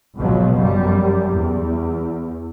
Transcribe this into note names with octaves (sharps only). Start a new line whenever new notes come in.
G#1 C#2 B2 F3 F#3
F#2 G3
E2